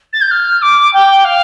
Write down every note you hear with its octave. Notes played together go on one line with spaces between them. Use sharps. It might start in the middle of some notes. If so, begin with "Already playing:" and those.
A6
G6
F6
D6
G5
F5